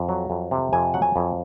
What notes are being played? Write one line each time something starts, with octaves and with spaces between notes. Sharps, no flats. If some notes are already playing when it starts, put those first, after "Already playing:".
Already playing: F2
F#3
F2
C3
F2 G#5
F#3 F#5
G#5
F2